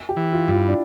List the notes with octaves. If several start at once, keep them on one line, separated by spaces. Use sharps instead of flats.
G4
E3
F4
G2 F4
E4
D4